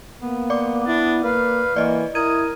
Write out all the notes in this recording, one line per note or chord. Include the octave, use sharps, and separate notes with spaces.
A#3 B3
D5 D6
D4 E4
A#3 B4 F5
E3 A#3 D5 D#5
E4 A#4 D#6 G#6 D#7